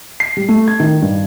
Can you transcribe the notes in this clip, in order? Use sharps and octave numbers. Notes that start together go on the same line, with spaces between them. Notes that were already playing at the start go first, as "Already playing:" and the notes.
C7
G3
A3
G#6
D#3
G2